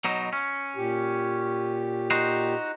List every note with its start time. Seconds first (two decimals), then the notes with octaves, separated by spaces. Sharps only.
0.05 B2 F#3 D#4
0.33 C#4
0.76 A#2 G4
2.11 D#4 F#4 C5